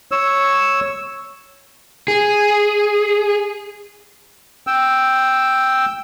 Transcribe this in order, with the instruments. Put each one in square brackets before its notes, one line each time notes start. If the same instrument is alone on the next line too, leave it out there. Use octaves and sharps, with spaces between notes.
[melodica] C#5 E6
[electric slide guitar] G#4
[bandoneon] G5 E6